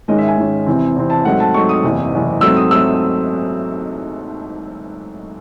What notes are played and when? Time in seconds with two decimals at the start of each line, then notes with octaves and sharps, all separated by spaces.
0.08 G#2 D#3 G#3 C#4 D#5
0.18 E5
0.28 G#5
0.37 G#2 D#3 G#3 C#4
0.66 E2 C3 E3 C4
0.96 E2 C3 E3 C4
1.10 A5
1.25 G#2 F#3 A3 C4 F#5
1.40 A5
1.54 G#2 F#3 A3 C4 C#6
1.69 D#6
1.83 F#1 E2 C3
2.12 F#1 E2 C3
2.41 G#2 F#3 A3 C4 E6
2.56 D#6
2.70 F#3 A3 C4 E6